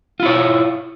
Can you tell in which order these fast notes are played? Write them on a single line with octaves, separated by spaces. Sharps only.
F4 E4 C#5